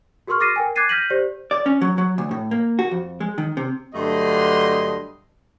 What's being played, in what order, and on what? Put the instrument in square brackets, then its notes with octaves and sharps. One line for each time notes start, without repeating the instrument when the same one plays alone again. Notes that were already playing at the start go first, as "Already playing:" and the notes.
[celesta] F#4 G#4 A#4 C6 C#6 F6
D6 F6 A6 A#6 C7 D#7
A#4 G5 G#5
D6 F#6 G#6 A6 C7 D#7
F6 G6 A#6 B6 D#7 F#7
G4 C5 D5
[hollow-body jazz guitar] D5
C#4
F#3
F#3
D2
A2
A#3
F#4
F2
G#3
D#3
C3
[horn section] G2 D3 F#3 A3 D#5 C6